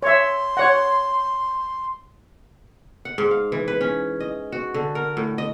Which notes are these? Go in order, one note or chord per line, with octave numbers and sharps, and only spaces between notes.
C#5 E5 C6
C#5 F#5
F#5
G#2
F5
E3
B4
C#4
D#5
F#4
D3
A#4
A2
D#5